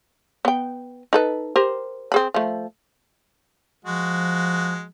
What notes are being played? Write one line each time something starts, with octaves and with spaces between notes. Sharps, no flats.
B3 G5
D#4 A4 B4
G4 A#4 C5
C4 G#4 B5
F3 A3
F3 G#3 F#4